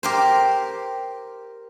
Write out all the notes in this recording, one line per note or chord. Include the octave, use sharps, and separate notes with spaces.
G4 A#4 C5